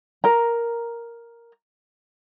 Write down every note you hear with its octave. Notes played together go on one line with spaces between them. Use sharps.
A#4 A#5